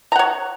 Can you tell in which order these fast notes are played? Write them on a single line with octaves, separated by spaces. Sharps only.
A#5 F#5 C#5